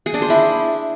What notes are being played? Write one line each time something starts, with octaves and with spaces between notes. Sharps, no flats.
G#4
D4
C5
E4